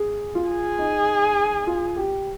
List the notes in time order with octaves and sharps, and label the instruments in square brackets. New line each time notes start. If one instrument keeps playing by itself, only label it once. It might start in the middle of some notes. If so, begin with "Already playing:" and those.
Already playing: [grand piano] G#4
F4
[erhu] G#4
[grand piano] D#4
F4
G4